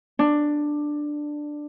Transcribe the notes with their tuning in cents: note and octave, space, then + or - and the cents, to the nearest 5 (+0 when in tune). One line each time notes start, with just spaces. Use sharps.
D4 +10